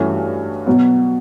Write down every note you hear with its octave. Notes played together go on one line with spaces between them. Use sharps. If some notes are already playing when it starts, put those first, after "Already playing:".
Already playing: G2 E3 A3 C#4 F#4
B2 F#3 B3